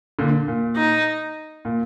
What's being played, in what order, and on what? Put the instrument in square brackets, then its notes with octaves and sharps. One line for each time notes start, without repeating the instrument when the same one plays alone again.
[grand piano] A#2 D3
A#2
[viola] D#4
[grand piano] A#2